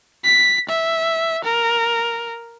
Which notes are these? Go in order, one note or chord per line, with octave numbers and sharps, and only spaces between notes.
B6
E5
A#4